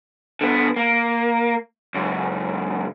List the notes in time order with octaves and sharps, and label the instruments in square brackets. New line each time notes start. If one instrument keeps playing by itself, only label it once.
[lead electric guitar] D3 B3
A#3
C#2 F#2